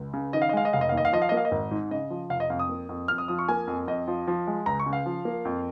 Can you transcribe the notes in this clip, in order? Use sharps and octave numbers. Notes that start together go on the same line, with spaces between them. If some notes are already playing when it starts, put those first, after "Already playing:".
Already playing: C#2
C#3
D#3 D#5
F5
D#5
G#3 F5
D#5
F1 F5
D#5
D#2 F5
D#5
F5
F3 D#5
F5
A#3 D#5
F5
D#5
G#1
G#2
C#3 D#5
F3
F1 F5
D#5
F2 F5
D#6
A#3
F2
F2 F6
D#6
F3 D#6
C#6
A#3 G#5
F2
F2 D#5
F3
F3
G#3
C#2 A#5
C#6
C#3
F5
F3
A#3
F2